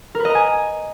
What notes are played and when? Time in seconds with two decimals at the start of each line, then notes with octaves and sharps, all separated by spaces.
0.15 A#4
0.20 B4
0.25 D#5
0.30 A#5
0.35 G#5